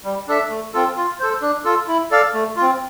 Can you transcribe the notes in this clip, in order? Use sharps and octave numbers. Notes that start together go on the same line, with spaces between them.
G3
D4 A4 E5
A3
C4 F4 A4
F4
A4 C5
D4
F4 A4
E4
A4 D5 F5
A3
C4 F4